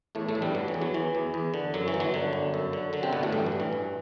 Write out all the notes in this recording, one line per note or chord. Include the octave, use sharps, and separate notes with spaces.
E2 A2 A3
A2 A3
E2
G2 G3
D3 F#3
E3
E2
F#3
E2 E3
E2
E2
D3
F#2 F#3
E3
G1
F#3
D3
G1
F#2
D3
D3 F#3
C3 C4
G1 B2 B3
A2 A3
A1 G2 G3
F#3
G2
E3
A1